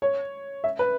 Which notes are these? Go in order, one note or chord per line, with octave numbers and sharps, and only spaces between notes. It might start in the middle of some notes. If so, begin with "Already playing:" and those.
C#5
E5
B4